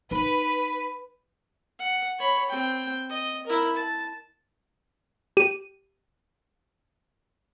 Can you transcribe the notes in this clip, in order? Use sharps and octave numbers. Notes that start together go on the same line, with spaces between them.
D#4 B4
F#5
C#5 B5
C4 G5
D#5
E4 A#4
A5
G4 D#7